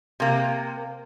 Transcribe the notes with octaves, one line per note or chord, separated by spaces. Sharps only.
C3 A#3